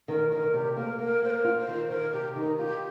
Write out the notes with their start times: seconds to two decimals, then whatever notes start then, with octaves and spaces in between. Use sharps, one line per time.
0.08 D#3 A#4
0.32 D#3 A#4
0.53 C3 G4
0.77 A#3 A#4
0.99 A#3 A#4
1.22 A#3 C5
1.30 A#4
1.44 F4
1.60 C5
1.68 D#3
1.90 D#3 A#4
2.13 C3 G4
2.36 D#3 D#4
2.58 F4 G4